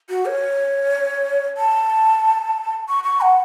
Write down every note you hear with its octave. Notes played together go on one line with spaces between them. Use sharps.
F#4
C#5
A5
C#6
C#6
F#5